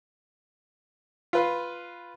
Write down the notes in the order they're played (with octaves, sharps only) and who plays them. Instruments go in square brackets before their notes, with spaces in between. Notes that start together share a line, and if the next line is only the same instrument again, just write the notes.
[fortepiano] F4 B4 F5